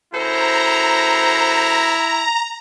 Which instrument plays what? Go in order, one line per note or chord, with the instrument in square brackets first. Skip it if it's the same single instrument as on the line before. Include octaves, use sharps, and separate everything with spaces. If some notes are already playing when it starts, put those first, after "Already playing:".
[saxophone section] F#2 A4 C5 [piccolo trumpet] E4 [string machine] A#5